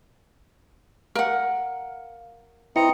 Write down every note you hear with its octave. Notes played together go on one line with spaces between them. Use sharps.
A#4 F5 F#5
C4 E4 B4 D#5 G5 A#5 C#7